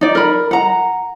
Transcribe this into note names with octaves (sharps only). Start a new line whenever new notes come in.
D#4 D5
A#4 B5
F#5 A#5